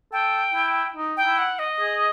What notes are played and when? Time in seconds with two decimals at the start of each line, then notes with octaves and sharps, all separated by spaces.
0.12 A4 G5
0.54 E4
0.96 D#4
1.17 G5
1.24 E4
1.38 F#5
1.59 D#5
1.80 G#4